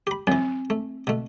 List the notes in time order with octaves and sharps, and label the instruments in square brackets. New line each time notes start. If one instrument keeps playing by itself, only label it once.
[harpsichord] G4 B5
[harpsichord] F#2 E3 [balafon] C4
[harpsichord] A3
B2 A3